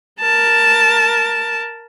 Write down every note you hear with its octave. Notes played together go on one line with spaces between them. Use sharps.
A#4 A5